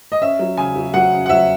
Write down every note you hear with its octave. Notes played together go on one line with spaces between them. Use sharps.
D#5
C#4 E5
F#3
C#3 G#5
F#3
F#3 F#5
C#3
F#5
F#3 E5